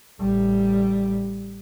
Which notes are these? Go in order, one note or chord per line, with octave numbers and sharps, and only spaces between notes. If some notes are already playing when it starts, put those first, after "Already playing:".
A1 G3